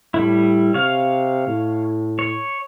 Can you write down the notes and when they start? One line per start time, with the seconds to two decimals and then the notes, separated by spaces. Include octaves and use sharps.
0.14 A2 G3 E4
0.74 C3 C#5 F5
1.47 A2
2.19 C#5